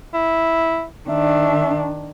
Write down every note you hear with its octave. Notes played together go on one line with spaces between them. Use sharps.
E4
D#3 D4 E5